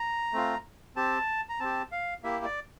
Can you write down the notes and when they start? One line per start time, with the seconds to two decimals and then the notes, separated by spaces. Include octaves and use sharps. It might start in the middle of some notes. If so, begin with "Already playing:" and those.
Already playing: A#5
0.33 A3 C4 F4
0.96 C4 G4 A5
1.49 A#5
1.60 C4 G4 A5
1.92 F5
2.23 A#3 E4 G4 E5
2.45 D5